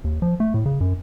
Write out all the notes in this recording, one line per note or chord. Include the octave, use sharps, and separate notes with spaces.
D#2
F3
A3
A2
C#3
F#2